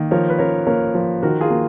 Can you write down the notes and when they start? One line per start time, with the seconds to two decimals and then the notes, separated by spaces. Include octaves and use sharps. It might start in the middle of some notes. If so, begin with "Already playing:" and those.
Already playing: D#3 A#3
0.11 F3 A#4 C#5
0.29 B4
0.39 C#4 A#4 C#5
0.67 A#3 A#4 C#5
0.95 F3
1.23 D#3 F#4 A#4
1.41 F4 G#4
1.50 A#3